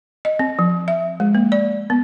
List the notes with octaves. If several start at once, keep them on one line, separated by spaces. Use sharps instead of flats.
D#5
C4
F3
E5
G#3
A#3
D5
B3